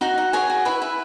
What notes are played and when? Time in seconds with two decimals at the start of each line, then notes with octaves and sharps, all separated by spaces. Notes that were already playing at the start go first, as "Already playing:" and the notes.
0.01 D#4 F#4 F#5
0.18 D#4
0.33 G#4 C#5 G#5
0.50 F#4
0.65 E4 B4 B5
0.82 E4